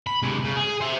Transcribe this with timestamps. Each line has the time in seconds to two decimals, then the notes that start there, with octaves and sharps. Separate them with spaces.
0.07 B5
0.22 C3 G#3
0.44 C#3
0.57 G#4
0.81 C5 E5